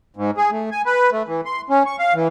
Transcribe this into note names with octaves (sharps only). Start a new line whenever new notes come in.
G#2
G#4
A3
G#5
B4
A3
E3
C6
C#4
C#6
F5
E3